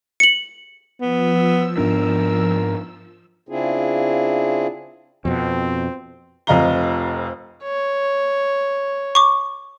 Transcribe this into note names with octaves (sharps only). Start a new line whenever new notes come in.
C#7 F#7
F3 B3 E6
G#2 B3 D4 A#4
C#3 C4 D4 E4 F4 G#4
F2 B2 C4
F1 F2 D#5 F5 A#5 G7
C#5
C#6 D6